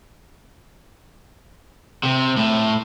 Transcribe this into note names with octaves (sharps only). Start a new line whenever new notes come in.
C3
A2